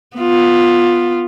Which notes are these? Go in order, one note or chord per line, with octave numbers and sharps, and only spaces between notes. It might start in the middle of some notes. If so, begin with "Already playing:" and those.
B3 F4